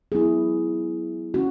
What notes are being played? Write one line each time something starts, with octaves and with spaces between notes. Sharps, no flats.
F#3 B3 E4 G#4
D3 A3 C#4 F#4